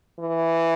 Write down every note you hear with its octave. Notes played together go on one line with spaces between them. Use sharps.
E3